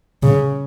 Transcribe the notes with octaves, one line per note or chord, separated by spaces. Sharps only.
C#3